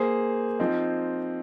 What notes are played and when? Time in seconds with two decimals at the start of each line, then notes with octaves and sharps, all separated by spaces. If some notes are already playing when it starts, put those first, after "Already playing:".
Already playing: A#3 G#4 C5
0.60 F3 C4 D#4